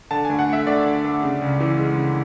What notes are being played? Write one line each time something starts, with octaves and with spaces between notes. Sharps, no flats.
D3 A5
G#5
D2
F#5
A3 E5
D2 D5
D3
D2
C#3
C#2
E3
G#3
C#3